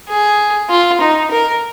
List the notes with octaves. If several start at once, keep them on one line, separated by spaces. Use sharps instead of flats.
G#4
F4
D#4
A#4